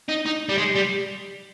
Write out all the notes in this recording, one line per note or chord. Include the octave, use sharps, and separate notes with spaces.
D#4
D#4
G3
G#3
G3